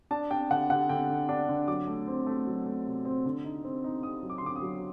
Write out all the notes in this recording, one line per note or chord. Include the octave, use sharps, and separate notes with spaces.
D4 A5
D4 G5
D3 F#5
D3 F#5
D3 G5
D3
D4
D3
F#3 D6
A3
C4
A3
F#3
A3
C3
C4
D3
D#4
C4
D#4
D#4 D#6
F#3
D6
C6
D3 D6
D#6
F#3